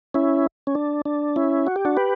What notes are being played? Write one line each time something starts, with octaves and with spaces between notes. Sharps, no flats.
C#4 E4
C#4
D4
D4
C#4 E4
F#4
G4
D4 F#4
G4 B4